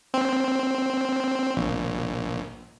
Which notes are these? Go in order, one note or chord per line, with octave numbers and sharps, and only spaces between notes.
C4
A#1